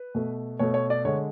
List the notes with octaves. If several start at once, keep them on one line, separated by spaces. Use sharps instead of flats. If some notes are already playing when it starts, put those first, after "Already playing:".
Already playing: B4
B2 A3
B2 A3 C#5
C#5
D5
D3 G#3 C#5